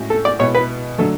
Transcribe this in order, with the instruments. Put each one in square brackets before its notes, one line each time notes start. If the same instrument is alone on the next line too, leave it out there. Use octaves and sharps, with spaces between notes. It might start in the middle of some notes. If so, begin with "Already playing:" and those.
Already playing: [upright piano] A2 G#3 C#4 F#4
[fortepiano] A4
D5
[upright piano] B2 G#3 B3 E4 [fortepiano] C#5
[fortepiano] B4
[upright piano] D3 F#3 A3 [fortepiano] A4